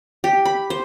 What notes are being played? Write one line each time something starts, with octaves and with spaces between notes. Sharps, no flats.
G4
B5
C5